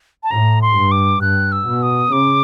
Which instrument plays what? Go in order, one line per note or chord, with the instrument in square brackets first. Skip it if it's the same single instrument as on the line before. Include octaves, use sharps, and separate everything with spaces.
[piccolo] A5
[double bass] A2 [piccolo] A#5
[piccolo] C6
[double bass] G2
[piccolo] D6
[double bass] G2 [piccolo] F#6
[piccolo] E6
[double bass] B2
[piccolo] D#6
[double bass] C#3 [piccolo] D6